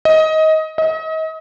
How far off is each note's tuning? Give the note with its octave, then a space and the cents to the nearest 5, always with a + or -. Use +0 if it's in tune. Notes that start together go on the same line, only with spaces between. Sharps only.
D#5 +20
D#5 +35